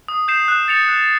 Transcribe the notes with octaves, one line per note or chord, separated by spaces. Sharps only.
D#6
G6 C7 E7
F#6
A6 C#7 F7
F#6